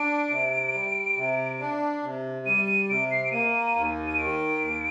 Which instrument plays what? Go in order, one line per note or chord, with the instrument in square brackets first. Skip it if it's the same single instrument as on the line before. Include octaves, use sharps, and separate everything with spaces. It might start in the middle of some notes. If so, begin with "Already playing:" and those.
Already playing: [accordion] D4 [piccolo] D7
[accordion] C3
G3
C3
D4
C3
[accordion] G3 [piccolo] D#7
[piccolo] D#7
[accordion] C3 [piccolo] D7
[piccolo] C7
D7
[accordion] A#3 [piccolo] D#7
[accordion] D#2
[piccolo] D#7
[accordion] D#3 [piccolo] D7
[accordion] D#2